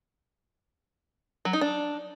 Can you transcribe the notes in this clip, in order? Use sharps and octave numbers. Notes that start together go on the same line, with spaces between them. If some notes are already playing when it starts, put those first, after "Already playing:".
F#3
D#4
D4